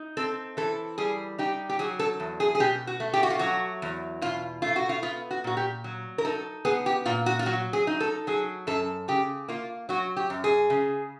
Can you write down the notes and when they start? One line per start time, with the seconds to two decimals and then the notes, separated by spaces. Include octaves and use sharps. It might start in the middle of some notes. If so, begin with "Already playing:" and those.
Already playing: D#4
0.17 C4 A4
0.57 E3 A4
0.98 G3 G#4
1.38 D#4 G4
1.69 G4
1.79 F#3 G#4
1.99 A4
2.20 E2
2.40 G#4
2.55 G#4
2.60 B2 G4
2.87 F#4
3.00 A3
3.13 G4
3.23 F#4
3.30 F4
3.39 F#3 F#4
3.82 E2
4.22 B2 F4
4.62 A3 F4
4.76 F#4
4.89 F4
5.02 B3 F4
5.31 F#4
5.44 A#2 F#4
5.57 G4
5.84 F#3
6.18 A#4
6.25 D#4 A4
6.65 B3 G#4
6.86 G4
7.06 A#2 F4
7.26 F#4
7.39 F4
7.46 F#3 F#4
7.73 G#4
7.87 D#4
8.00 A4
8.27 F#3 G#4
8.67 F#2 A4
9.08 C#3 G4
9.48 A#3 F4
9.89 F#3 F#4
10.17 G4
10.30 F#2
10.44 G#4
10.70 C#3